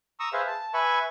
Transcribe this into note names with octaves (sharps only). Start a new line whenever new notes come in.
A#5 C#6 D#6 E6
G#4 B4 C5 E5 F5
A5
B4 E5 G#5 B5 C#6